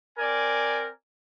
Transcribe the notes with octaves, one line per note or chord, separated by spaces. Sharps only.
C4 A#4 D5 G#5